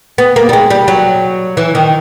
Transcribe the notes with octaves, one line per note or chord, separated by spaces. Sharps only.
B3
A#3
G3
G#3
G3
F#3
E3
D#3